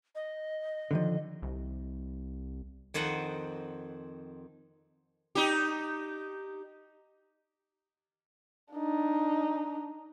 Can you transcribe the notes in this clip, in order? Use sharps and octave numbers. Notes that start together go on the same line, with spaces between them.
D#5
D3 D#3 F3
C2
F2 D#3 C5 D#5 F#5
D#4 G4
D4 D#4